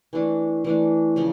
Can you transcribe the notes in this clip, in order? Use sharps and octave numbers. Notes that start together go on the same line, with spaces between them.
E3 A3 D4
E3 A3 D4
C#3 F3